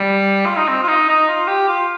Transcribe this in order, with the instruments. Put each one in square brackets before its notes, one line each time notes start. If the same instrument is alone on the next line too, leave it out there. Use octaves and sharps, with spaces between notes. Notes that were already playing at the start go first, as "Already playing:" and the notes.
Already playing: [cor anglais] G3
F4
D#4
C4
F4
D#4
D#4
F4
G4
F4